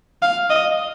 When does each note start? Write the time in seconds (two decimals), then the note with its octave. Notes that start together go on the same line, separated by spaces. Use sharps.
0.23 F5
0.50 D#5